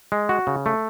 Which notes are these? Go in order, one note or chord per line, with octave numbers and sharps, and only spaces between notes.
G#3
F#4
C#3
A3